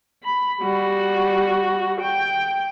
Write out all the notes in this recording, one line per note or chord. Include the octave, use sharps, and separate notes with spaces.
B5
G3 F#4
G5